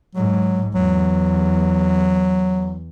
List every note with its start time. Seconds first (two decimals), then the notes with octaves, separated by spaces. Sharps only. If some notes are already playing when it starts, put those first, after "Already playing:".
0.15 G#2 F#3
0.75 E2 F#3